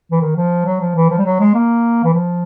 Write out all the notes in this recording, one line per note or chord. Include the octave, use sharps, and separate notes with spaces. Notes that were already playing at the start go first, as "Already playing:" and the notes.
E3
D#3
F3
F#3
F3
E3
F3
G3
F#3
G#3
A#3
E3
F3